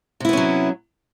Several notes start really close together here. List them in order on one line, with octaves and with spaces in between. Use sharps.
C3 E4 B3 C#4 F#3